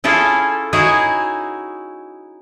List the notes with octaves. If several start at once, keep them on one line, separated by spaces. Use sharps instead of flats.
C#4 E4 F4 G#4 A4
D#4 E4 F#4 G#4 C#5